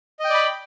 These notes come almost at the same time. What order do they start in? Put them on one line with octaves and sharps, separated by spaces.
D#5 G5 D5 B5